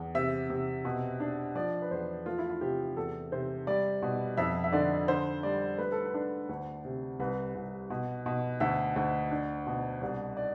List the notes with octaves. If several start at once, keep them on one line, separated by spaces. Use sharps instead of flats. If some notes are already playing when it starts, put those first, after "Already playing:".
Already playing: E2
C3 E5
C3
B2
D4
F3 D5
B4
E2 C5
A3 F4
E4
F4
C3 G4
E2 A4
C3 C5
G3 D5
B2
F2 E5
E5
D3 D5
D3 C5
G3 D5
A3 B4
A4
B4
D4
D2
C3
C2 B4
C2
B2
B2
D2 E5
D2
D4
B2
C2 D5
D5